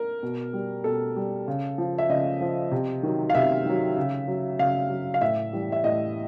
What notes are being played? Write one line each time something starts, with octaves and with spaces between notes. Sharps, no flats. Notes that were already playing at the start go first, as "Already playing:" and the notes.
Already playing: A#4
B2
G3
B2 A4
G3
C#3
F3
E5
C#3 D#5
F3
C3
D#3 F#3
F5
C3 E5
D#3 F#3
C#3
F#3
C#3 F5
F#3
F5
A2 E5
E3 G3
E5
A2 D#5